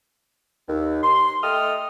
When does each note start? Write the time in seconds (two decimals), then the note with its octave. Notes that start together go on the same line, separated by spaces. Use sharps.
0.67 D#2
1.03 C6
1.43 A3 A4 D#5 G5 D#6 F6